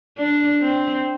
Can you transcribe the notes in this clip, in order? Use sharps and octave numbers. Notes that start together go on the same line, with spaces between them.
D4
C4